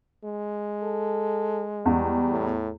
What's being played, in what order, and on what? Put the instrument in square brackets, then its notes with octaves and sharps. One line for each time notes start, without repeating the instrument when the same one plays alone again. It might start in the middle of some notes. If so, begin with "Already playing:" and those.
[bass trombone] G#3
[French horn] A4
[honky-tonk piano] E2 [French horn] G3
[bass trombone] A2